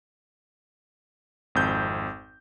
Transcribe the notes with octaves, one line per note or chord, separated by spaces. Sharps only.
G#1 F2 G6